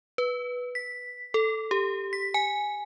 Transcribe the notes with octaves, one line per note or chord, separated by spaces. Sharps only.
B4
B6
A4
G4
B6
G#5